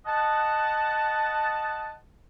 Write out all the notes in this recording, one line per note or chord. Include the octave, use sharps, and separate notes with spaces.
D#5 F#5 A5